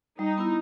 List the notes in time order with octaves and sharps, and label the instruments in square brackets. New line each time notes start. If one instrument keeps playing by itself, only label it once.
[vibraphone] G3 [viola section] D#4
[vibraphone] B3 E4